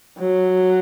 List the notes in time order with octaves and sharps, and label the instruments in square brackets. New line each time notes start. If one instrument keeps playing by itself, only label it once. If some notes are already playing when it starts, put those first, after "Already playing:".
[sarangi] F#3